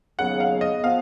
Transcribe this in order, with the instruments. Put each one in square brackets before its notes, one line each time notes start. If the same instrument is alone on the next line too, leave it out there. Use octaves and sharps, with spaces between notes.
[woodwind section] D#2 C#3 F#3 B3 [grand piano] F#5
[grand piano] F5
D#5
[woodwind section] F3 B3 [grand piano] F5